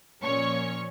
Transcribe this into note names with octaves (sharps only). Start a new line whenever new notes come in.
A#2 F3 C#4 C#5 C#6